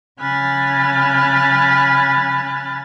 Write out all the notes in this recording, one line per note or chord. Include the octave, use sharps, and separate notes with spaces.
C#3 G#5 B5 F6 F#6 A6